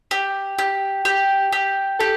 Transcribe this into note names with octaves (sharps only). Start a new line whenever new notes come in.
G4
G4
G4
G4
G4 A4